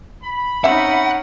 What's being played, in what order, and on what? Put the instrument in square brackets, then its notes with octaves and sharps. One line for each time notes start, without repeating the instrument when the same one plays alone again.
[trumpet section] B5
[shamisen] C4 F#4 E5 [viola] C#4 D#4 [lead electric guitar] F#5